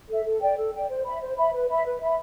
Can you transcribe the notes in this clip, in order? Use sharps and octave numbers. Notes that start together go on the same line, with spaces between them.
A4 E5
A4
D5 G5
A4
D5 G5
C5
E5 B5
C5
E5 B5
B4
E5 B5
B4
E5 B5